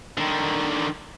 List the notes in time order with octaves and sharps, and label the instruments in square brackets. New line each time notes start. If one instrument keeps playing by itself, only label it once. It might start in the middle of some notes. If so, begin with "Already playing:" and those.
[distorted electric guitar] D3 D#3